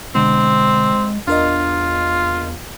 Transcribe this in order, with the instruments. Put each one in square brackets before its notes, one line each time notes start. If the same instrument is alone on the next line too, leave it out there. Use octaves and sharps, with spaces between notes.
[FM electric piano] B2 D3 [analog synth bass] G#3 [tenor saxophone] C4
[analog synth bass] E2 [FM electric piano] D4 A#4 D#5 [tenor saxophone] F4